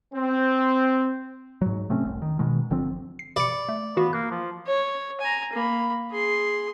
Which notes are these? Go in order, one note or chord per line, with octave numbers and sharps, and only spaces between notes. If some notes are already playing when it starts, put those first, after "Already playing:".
C4
G#2 F#3
C3 A3 C4 C#4
F1 C2
D#3
B2 D#3 G#3
G1 D3 F3 C4
C7
D5 B5 D6 C#7
A3
E3 B3 F#4 F5
A#3 F#6
F3
C#5
G#5 A#5
A#3 B5
G#4 C6